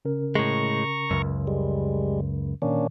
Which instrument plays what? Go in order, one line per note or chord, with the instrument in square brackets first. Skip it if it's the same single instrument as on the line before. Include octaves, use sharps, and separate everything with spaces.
[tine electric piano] C#3 C#4 A#4
[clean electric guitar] A2 G#3 [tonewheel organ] A#5 C#6
[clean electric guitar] C#2 F#2
[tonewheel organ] G3 G#3
[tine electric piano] A#2 D#3 [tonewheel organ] A#3 C#4 D4